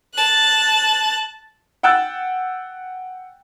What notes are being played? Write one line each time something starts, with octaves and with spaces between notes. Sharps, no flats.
A5 F#6
F#5 G5 E6 F#6 A6